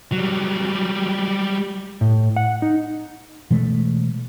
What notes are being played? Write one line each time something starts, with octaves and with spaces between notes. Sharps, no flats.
F#3 G3
A2
F#5
D#4
B2 E3 G#3 A3